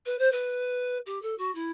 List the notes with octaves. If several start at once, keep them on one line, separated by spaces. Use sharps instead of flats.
B4
C5
B4
G4
A4
F#4
E4